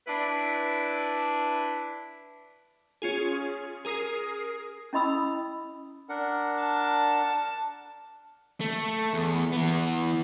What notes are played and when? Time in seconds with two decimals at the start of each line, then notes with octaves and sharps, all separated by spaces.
0.08 D4 E4 B4
3.02 C#4 F4 G#4
3.85 G#4 A#4 D#6 C7
4.93 C#4 E4 D#5 B5 D#6 E6
6.09 D4 A#4 F#5
6.61 A5
8.60 A3
9.13 E2
9.52 E3 B3